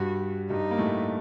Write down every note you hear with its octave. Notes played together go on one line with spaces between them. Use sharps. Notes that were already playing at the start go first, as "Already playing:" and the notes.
Already playing: G2 G3 F#4
G2 G3 D#4
A#3
A2 A3